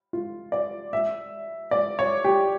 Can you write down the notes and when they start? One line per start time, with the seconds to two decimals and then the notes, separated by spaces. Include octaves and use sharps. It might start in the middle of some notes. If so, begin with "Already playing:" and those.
0.13 F4
0.52 D5
0.93 E5
1.71 D5
1.99 C#5
2.25 G4